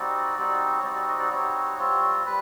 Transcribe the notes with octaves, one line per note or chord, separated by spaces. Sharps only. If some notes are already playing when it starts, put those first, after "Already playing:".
Already playing: G3 C4 D#4 F#4 D5
G3 C4 D#4 F#4
C#5
G3 C4 D#4 F#4 D5
D5
D#5
D5
G3 C4 D#4 F#4 C#5
G3 C4 F4
G3 B4